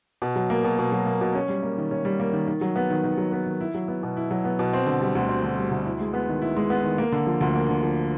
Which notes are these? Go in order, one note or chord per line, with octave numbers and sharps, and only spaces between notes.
B2
F#3
A#3
B2
B2
F#3
A#3
B2
C#4
G3
A#3
D#3
C#4
G3
A#3
D#3
D#3
F#3
B3
D#3
D#3
F#3
B3
D#3
E4
F#3
B3
B2
E4
F#3
B3
B2
C4
D3
G3
D2
C4
D3
G3
D2
E4
G#3
B3
D#3
E4
G#3
B3
D#3
A#3
D3
F3
D2
A#3
D3
F3